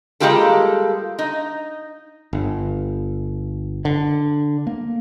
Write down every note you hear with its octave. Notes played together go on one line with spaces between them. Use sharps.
G3 G#3 A#3 F4 G4 A4
D#4
G1
D3
A#3